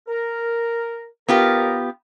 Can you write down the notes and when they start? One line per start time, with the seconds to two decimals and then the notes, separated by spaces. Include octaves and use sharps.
0.08 A#4
1.28 D#2 B3 F4 G4 A#4